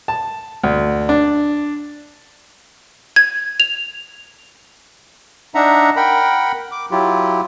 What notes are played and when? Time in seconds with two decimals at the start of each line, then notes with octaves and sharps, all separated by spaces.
0.08 A5
0.64 D2
1.09 D4
3.16 G#6
3.60 F7
5.55 D4 D#4 E5 F#5 A#5
5.97 A#4 F#5 G5 B5
6.72 D6
6.91 F#3 E4 F4 G4